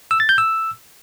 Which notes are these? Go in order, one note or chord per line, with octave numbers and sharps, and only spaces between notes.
E6
A6
G6
E6